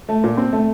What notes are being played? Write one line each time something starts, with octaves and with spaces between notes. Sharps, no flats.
A3
A#2
C4
A3